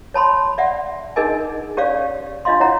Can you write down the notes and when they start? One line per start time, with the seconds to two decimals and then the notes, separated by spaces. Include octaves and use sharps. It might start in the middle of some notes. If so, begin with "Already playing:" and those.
0.14 C#5 A5 B5 C6
0.58 D5 E5 F#5
1.16 D4 D#4 G#4 A#4 D#5 G#5
1.77 C#4 G4 C#5 D5 F5
2.45 D4 F4 D#5 F5 C6
2.60 E4 C#5 F#5 A#5